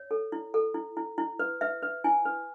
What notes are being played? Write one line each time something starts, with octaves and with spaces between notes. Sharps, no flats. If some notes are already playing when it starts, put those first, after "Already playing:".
Already playing: C#5
A4
E4
A4
E4
E4
E4
B4
B4 E5
B4
E4 G#5
B4